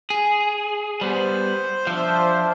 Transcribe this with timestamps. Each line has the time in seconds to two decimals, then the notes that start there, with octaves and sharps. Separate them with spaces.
0.10 G#4
1.01 G3 B3 C5
1.87 F3 D4 F4 E5